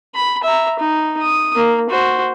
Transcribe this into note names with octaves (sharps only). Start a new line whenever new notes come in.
B5
E5 A#5
D#4
D#6
A#3
F#4 C5